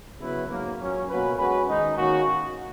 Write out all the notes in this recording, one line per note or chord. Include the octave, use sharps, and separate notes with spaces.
C#3 F#3 B3 E4 B4
G#2 F#3 A#3
A#2 F#3 C#4
B2 A#3 C#4 F#4 B4
G#3 C#4 F#4 B4
D#3 G#3 D#4
D#3 A#3 C#4 F#4